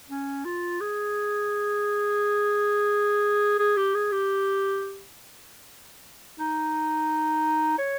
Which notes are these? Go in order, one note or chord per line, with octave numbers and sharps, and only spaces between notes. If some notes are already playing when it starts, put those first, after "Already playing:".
C#4
F4
G#4
G#4
G4
G#4
G4
D#4
C#5